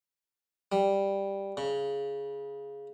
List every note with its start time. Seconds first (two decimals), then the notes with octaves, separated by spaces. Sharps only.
0.72 G3
1.57 C#3